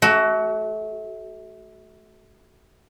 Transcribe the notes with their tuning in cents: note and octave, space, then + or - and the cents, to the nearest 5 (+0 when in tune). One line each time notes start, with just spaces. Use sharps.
A3 -30 F#4 +20